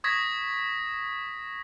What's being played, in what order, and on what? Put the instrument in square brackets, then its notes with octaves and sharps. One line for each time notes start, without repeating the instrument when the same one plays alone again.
[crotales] C#6 D#6 G#6 A#6 B6